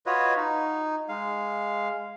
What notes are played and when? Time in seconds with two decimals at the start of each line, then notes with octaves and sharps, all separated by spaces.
0.06 F4 F#4 B4 C#5 D#5
0.36 D#4
1.09 G#3 F5